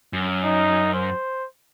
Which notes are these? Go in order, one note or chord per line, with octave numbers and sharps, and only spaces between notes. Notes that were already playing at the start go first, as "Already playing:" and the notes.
F#2
D#4
C5